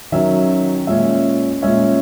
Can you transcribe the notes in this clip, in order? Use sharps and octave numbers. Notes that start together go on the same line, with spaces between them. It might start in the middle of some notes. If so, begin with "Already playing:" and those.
D#3 F#3 C#4 E5
A#2 G#3 C#4 E5
A#2 G#3 C#4 E5